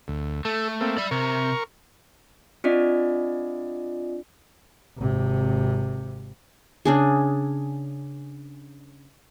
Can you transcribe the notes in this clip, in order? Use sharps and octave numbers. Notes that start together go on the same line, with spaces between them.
D2
A3 A4
A#3 C4 A4
D5 E5 B5
C3 A#4 C#6
C4 D4 F4 D5 D#5
G#1 C3
C#3 D4 G#4